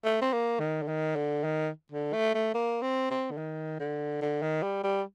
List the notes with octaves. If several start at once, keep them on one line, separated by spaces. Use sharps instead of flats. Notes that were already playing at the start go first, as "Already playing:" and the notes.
A3
C4
A#3
D#3
D3
D#3
D3
D#3
D3
A3
A3
A#3
C4
C4
D3
D#3
D3
D3
D#3
G3
G3